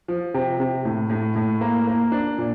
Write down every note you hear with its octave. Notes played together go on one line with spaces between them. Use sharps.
F3
C3
C3
A2
A2
A2
A#3
A#3
D4
A#2